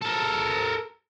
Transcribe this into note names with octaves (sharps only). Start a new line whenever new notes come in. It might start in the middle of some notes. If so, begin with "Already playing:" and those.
A4 A#4